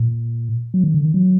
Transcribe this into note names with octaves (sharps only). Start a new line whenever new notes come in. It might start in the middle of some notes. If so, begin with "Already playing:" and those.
Already playing: A#2
F#3
D#3
D3
D#3
F#3